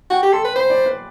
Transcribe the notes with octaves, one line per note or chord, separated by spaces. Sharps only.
F#4 G5
G4
A4 C6
B4
C5 B5
D5
B4